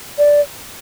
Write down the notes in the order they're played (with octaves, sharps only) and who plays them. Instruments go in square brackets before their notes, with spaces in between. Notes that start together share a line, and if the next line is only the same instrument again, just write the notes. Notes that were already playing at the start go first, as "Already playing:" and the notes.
[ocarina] D5